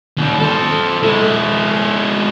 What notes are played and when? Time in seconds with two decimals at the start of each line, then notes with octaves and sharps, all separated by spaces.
0.17 D#2 G3
0.40 A4 C5
1.03 G#3 E4